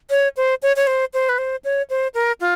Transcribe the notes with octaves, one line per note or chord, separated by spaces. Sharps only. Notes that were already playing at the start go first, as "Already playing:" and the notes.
C#5
C5
C#5
C#5
C5
C5
B4
C5
C#5
C5
A#4
F4